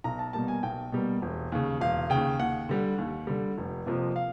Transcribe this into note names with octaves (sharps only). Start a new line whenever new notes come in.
B1 A#5
A5
B2 G3 A#3 A5
G#5
B1 G5
B2 G3 A#3
E1
D#2 C#3
E1 F5
D#2 C#3 G5
D#2 F#5
D3 G3
D#2
D3 G3
F1
F2 C3 F3 A#3
F5